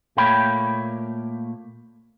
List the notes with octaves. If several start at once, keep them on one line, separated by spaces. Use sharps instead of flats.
A#2 A3 A#3 C#5 G5 B5